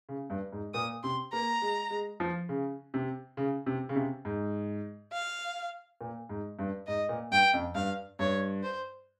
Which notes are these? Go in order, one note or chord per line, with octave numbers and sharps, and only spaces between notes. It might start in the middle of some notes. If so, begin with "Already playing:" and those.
C#3
G2
G#2
A#2 D#6
C3 C6
A#3 A#5
G#3
G#3
F3
C#3
C3
C#3
C3
C#3
C3
G#2
F5
A#2
G#2
G2
G#2 D#5
A#2
G2 G5
F2
G2 F5
G2 C#5
C5